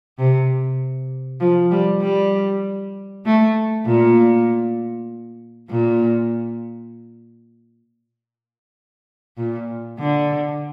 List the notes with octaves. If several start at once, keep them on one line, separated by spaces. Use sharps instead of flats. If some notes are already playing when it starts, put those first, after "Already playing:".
C3
F3
G3
G3
A3
A#2
A#2
A#2
D3